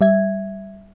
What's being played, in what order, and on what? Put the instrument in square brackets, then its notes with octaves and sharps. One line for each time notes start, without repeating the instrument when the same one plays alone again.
[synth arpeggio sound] G3 E5 G#6